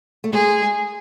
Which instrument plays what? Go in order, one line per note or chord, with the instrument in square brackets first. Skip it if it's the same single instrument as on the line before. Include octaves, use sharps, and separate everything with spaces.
[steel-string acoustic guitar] A3
[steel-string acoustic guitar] G#3 [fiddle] G#4